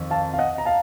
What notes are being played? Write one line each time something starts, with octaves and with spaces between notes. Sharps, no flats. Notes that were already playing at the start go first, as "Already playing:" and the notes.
Already playing: F2 D#3
F5 A5
F5
D#5 F#5
A#5
F5 A5